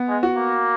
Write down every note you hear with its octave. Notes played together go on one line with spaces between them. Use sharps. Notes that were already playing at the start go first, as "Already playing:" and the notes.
Already playing: B3
G#3
F#4
A#3